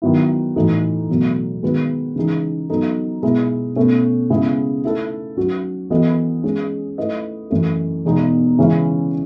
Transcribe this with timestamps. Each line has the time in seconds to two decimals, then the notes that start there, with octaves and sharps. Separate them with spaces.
0.02 D#3 F#3 B3 E4
0.56 A2 E3 A3 D#4 F#4
1.09 E2 B2 F#3 A3
1.63 D#3 G#3 B3 F#4 B4
2.16 C#3 E3 G#3 D#4 G#4
2.70 F#3 B3 D#4 A4
3.23 B2 G#3 B3 E4
3.76 B2 A3 C#4
4.30 C#3 G#3 B3 E4 G#4
4.84 A3 E4 A4
5.37 F#3 C#4 F#4
5.90 E3 B3 F#4 A4 D#5
6.44 G#3 C#4 G#4
6.98 A3 E4 B4 D#5
7.50 F#2 E3 A3
8.05 E2 B2 G#3 D#4 G#4
8.58 C#3 E3 G#3 C#4 E4